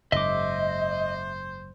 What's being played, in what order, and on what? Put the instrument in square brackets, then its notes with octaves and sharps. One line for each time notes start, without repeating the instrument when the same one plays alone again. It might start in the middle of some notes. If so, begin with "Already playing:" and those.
[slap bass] F#1 G#2 [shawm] C5 [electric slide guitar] D#5 [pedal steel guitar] E5 D6